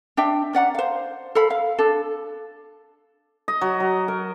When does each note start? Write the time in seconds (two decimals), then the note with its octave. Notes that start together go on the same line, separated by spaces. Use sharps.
0.17 D4 E5 G5
0.53 C#4 D5 F#5 A#5
0.75 C5 F5
1.35 A4 F5 B5
1.50 F5
1.79 D4 A4
3.48 D#5
3.61 F#3
3.80 F#3
4.08 A#4